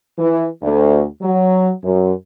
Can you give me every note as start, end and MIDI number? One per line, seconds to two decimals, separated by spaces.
0.18 0.45 52
0.62 1.03 38
1.22 1.71 54
1.84 2.11 42